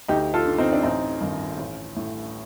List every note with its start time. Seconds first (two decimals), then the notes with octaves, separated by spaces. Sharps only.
0.08 D2 D#4 G4
0.34 F4 A4
0.46 D3
0.58 C4 D#4
0.73 D4
0.83 A1 C4 D#4
1.21 G2 D#3
1.58 A1
1.96 A2